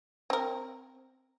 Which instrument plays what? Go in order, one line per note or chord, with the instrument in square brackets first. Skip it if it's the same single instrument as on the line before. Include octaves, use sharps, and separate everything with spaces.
[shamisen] C4 A#4